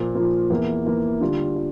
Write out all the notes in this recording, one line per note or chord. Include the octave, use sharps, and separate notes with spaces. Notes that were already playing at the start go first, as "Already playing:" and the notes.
Already playing: A#2 F3 A#3
A#2 F3 A#3
E2 E3 A#3 E4
E2 E3 A#3 E4
D3 G3 D4 F4
F4